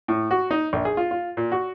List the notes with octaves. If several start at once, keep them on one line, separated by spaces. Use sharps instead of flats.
A2
F#4
D#4
A#1
G#4
F4
F4
A#2
F#4